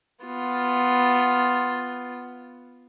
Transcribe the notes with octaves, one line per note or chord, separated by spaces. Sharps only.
B3 F4